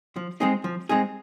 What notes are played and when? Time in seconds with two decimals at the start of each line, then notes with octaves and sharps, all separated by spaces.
0.16 F3
0.40 G#3 C4 D#4 G#4
0.64 F3
0.89 G#3 C4 D#4 G#4